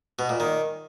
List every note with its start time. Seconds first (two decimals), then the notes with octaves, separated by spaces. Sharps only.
0.19 B2
0.29 A#2
0.40 D#3